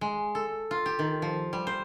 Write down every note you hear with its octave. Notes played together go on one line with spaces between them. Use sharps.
G#3
A4
F4
G4
D#3
F3
G3
C5